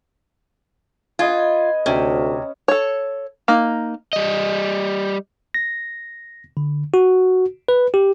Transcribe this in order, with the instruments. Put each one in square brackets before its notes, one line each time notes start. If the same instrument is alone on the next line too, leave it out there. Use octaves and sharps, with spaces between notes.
[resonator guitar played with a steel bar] F4 [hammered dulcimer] B4 D#5 G#5
[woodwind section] D2 [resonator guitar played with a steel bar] C3 [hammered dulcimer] C#4
[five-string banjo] A4 C#5
A#3 D#4
[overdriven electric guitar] G3 D#5
[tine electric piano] A#6
D3
F#4
B4
G4